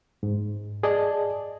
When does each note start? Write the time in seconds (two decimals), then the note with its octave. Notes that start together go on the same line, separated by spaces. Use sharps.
0.23 G#2
0.83 G#4 D5 D#5 A5